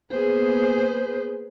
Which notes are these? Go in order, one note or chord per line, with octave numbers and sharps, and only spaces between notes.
A#3 B3 G#4 B4 C5